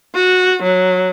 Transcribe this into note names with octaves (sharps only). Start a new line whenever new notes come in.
F#4
F#3